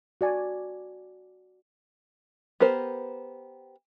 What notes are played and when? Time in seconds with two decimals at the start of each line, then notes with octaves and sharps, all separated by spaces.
0.21 F#4 D5 G#5
2.60 B3 G4 A#4 C5